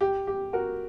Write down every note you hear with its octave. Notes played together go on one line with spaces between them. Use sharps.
G4
G4
F#4 A#4